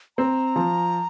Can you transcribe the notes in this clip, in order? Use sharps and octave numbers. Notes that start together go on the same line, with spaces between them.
C4 A#5
F3